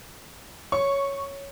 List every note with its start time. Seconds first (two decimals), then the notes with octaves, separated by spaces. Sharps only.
0.72 C#5 C#6